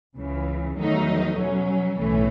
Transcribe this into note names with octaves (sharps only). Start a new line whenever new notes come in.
C#2 C#3 E3
E2 D#3 F#3 A3 D#4
B2 F#3 C#4
B1 A2 E3 A3 C#4